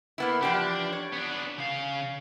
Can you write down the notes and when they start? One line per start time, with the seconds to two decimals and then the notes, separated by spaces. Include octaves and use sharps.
0.18 A#3 B3 E4
0.43 E3 F3 D4 G4
0.93 C#5
1.13 B3 D4
1.58 C#3 F5